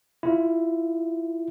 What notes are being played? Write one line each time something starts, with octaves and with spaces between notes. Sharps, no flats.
E4 F4